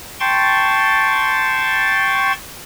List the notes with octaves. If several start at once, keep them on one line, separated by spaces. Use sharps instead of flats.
G5 A5 C6 C#6 A6